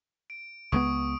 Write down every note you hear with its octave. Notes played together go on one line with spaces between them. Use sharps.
D7
C#2 G#3 B3 C#6 D#6 D7